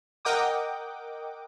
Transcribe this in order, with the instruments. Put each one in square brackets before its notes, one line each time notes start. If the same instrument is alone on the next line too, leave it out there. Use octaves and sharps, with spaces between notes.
[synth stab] A#4 D#5 F#5 G5 D6 D#6